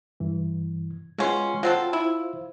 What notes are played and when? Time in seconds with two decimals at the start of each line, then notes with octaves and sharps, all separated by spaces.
0.20 G2 E3
1.18 B2 G#3 C#4 F4 C6
1.63 F#3 C4 F4 A4 C5 F5
1.93 E4